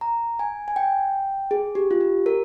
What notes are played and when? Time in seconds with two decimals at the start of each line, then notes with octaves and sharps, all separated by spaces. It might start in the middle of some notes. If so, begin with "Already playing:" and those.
0.01 A#5
0.39 G#5
0.68 G#5
0.76 G5
1.51 G#4
1.75 G4
1.91 F4
2.01 G4
2.26 A#4